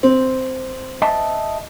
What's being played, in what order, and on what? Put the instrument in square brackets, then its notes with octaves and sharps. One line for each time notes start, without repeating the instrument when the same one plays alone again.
[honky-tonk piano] C4
[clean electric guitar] D#5 E5 A5